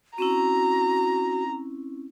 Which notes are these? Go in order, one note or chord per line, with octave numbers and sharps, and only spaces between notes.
C4 C#4 E4 F#4 A#5